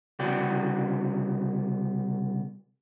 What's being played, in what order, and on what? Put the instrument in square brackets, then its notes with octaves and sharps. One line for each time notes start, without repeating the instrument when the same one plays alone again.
[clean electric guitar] C2 C#3 B3 F#4 D5 G5